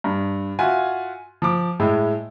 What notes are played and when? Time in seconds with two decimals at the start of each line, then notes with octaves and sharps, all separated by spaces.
0.04 G2
0.59 F4 F#4 E5 G#5
1.42 F3 D6
1.80 A2 G#3 E4